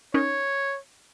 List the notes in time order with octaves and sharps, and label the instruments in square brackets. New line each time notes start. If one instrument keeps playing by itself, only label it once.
[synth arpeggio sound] C#4 D#4 A#4 [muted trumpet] C#5